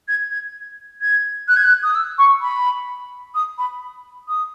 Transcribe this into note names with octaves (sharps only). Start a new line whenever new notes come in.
G#6
G#6
G#6
F#6
G#6
F#6
D#6
E6
C#6
B5
D#6
B5
D#6